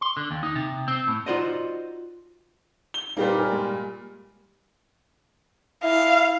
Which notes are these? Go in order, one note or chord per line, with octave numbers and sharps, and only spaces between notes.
C6
D3
D#2
D#4
C3
C4
A2
D#4 F4 F#4 C5 D5 D#5
G7
A#2 G3 A#3 D#4 A#4 B4
A#4 G#5 F6
G#3
E4 F5